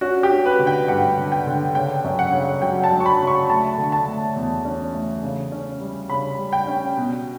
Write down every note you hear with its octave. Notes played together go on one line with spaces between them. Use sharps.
C#4 F#4
G4
C#4
B4
D3
G5
G2 F#5
D3
G5
D3
C#3 G5
F#2
F#5
C#3
F#3 G5
A5
F#3
C#6
B5
C#3
C#6
A3 A5
D3
A5
A3
E2
C#4
A3
C#3
C#4
G3
C#3 B5
G3
G5
C#4
B2